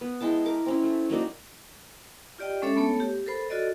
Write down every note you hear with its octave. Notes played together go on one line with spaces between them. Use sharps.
B3
G#3 E4 G5 A5
A#4 D6
C4 C#4 E4
A3
F#3 A#3 D#4 D5
F4 G4 D5 D#5 G5
G#3 C#4 D4 A4 C#5 E5
A3 B3 A4 C#5
G4
A4 A#4 C5 B5
F4 F#4 A4 D5 D#5